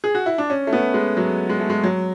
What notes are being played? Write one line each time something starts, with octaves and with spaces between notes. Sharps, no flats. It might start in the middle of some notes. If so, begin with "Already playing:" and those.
G#4
F#4
E4
D4
C#4
A3
B3
G#3
F#3
G#3
A3
G#3
F#3